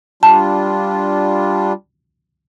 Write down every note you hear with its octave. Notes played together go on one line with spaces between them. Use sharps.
G3 D4 F4 A5